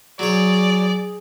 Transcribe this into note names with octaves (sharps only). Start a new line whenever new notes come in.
F#3 G#4 C#5 D5